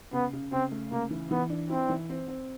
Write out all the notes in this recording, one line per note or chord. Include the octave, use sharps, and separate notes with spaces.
C#3 B3
C#3
C#3 C4
A3
C#3 A#3
E3
E3 B3
D4
C4 E4
E3
C4
C4